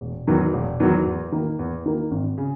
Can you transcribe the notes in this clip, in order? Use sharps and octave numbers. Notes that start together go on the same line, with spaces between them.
E1
E2 D#3 F#3
E1
E2 D#3 F#3
E2
D#3 A#3
E2
D#3 A#3
G#1
C#3